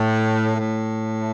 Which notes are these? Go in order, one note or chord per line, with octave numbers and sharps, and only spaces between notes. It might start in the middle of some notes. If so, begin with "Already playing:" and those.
Already playing: A2
A2